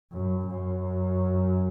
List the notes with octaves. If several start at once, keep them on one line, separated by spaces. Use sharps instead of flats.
F#2
F#2